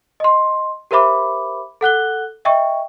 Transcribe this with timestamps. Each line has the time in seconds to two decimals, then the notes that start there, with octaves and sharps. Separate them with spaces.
0.20 D#5 C6
0.91 G4 A#4 C5 E5 B5 D6
1.81 A4 F#5 F#6 G7
2.45 D#5 E5 G5 C#6